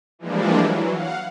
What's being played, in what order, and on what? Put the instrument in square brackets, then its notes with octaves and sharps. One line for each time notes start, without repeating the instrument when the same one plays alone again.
[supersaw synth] E3 F3 G3 G#3 A#3 D4
E3 F#3
F5 F#5